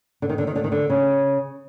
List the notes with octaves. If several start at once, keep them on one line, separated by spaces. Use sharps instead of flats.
D3
D#3
D3
D#3
D3
D#3
D3
C#3